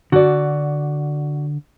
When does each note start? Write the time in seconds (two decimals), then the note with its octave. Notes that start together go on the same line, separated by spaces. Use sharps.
0.12 D3 F#4 D5